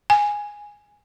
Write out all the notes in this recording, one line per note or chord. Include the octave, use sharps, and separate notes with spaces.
G#5